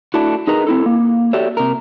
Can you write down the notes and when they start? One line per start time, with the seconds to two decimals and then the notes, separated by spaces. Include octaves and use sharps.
0.14 A3 D4 E4 F#4
0.47 D#4 G#4 A#4 B4 D#5 A#5
0.67 C4 E4 A4
0.86 A#3
1.33 F#4 G4 A4 C#5 D5 E5
1.57 C3 A#4